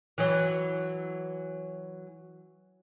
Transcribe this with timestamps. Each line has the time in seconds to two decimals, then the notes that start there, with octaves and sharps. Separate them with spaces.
0.18 E3 F#3